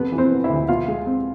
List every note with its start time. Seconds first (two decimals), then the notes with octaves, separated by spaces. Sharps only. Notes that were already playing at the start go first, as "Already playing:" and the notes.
Already playing: F2 C3 B3 B4
0.12 E3
0.18 C4 C5
0.31 B3
0.44 E4 E5
0.49 D2
0.68 B2 F4 F5
0.88 G#3
1.06 C4